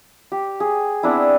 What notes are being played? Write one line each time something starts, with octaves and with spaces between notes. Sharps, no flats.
G4
G#4
B3 C4 D4 E4